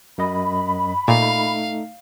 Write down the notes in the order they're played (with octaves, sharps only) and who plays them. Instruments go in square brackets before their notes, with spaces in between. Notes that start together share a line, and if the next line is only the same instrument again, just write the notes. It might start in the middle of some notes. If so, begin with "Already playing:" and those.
[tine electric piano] F#2 D#5 [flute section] B5
[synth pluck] A#2 [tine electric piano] A3 D#4 [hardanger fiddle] F5